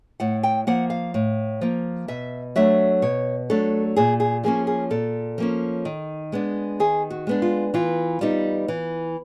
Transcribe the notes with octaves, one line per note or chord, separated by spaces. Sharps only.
A2 F#5
G5
F3 A#3 F#5
F5
A2
F3 A#3
B2 E5
F#3 A3 D4 E5
B2 C#5
F#3 A3 D4 A4
A#2 G#4
G#4
F3 A#3 C#4 G#4
G#4
A#2 A4
F3 A#3 C#4
D#3
G#3 B3 D4
D#3 G#4
F#4
G#3 B3 D4
F4
E3 F4
G3 B3 D#4
E3